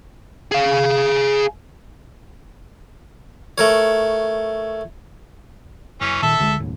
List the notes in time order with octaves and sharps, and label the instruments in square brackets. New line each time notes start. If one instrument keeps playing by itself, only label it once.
[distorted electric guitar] G#4 F5
[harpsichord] A3 A#4 C#5
[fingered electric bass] F#1 [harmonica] E3 C#4
[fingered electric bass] A#2 D#3 [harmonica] A4 E5
[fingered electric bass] C#2 D3 G#3
F#1 D#2 A2